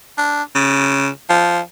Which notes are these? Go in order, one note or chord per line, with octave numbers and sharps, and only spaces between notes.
D4
C#3
F3